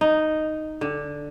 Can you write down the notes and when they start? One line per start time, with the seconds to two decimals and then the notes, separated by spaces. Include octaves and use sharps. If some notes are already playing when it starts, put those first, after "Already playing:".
0.01 D#4
0.81 D3